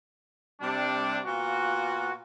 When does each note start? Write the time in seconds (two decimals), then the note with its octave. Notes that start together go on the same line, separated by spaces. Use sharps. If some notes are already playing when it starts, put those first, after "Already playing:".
0.61 C3 G3 D4
1.25 A#2 B3 F4 F#4